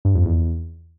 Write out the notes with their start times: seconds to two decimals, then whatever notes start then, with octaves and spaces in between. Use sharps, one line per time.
0.05 G2
0.15 F2
0.25 E2